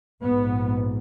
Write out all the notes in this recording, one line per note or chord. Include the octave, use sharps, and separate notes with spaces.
A#1 G#2 B3